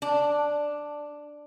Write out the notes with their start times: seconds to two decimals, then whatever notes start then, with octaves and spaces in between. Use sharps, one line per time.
0.02 D4